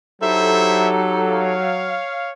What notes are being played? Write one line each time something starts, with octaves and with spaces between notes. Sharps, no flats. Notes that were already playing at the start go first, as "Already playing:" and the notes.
F#3 D#4 E4 G4 A4 C5 E5
C#5 F5